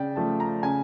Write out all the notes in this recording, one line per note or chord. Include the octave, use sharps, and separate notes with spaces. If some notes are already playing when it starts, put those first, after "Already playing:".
Already playing: C#3 D5 G5
F3 A3 A5
A#5
C#3 G#5